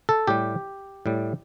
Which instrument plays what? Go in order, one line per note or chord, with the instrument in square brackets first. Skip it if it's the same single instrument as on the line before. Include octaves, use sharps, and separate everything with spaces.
[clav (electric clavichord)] A4
A2 G3 G4
A2 G3